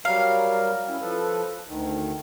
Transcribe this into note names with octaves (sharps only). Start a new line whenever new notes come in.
F#3 G3 A#4 F5
C#4 E4
F3 A4 B4
D2 D#3